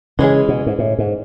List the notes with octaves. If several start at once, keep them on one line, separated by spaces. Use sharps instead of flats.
C#3 E3 G#3 C#4 G#4
B2
G#2
A2
G#2